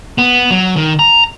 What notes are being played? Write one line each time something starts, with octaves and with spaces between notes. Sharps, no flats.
B3
F#3
D#3
A#5